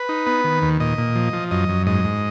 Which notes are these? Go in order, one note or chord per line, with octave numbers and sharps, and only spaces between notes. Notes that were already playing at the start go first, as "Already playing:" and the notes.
Already playing: B4
D#4
B3
D#3
D#2
A#2 D#5
A#2
F3
F3
F#2 D#5
F#2
G#2 D#5
G#2